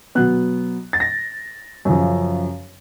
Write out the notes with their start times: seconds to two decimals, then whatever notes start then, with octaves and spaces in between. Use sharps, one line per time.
0.15 B2 F#3 B3 F#6
0.93 A6
1.00 A#6
1.85 F#2 C#3 F3